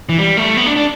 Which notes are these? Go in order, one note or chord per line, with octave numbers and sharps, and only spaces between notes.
E3
G3
A3
B3
D4
D4